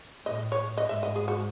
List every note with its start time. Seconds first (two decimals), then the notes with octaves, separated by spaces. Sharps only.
0.26 A2 D#5
0.52 C#5
0.77 G#2 D#5
0.89 E5
1.03 D#5
1.16 G#4
1.28 F#4